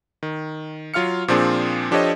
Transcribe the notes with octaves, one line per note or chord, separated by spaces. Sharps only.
D#3
F#3 F4 F5 F6 C#7
A#2 F3 C4 D4 G#4 C6
F3 D4 G4 A4 C#5 D#5